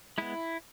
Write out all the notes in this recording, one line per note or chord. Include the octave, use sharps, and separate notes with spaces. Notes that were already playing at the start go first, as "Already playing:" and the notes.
G#3 B3 E4